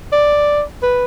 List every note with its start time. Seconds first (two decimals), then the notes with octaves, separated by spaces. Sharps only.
0.12 D5
0.83 B4